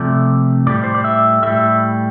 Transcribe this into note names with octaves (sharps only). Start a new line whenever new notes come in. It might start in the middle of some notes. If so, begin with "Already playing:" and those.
Already playing: C3 F3 A3 D5
A2 G3 D5
C5
D5
E5
A2 G3 E5